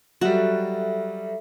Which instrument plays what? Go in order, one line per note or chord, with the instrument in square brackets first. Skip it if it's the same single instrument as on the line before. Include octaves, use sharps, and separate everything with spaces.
[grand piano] F#3 G3 [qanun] F#4 [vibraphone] A4 E5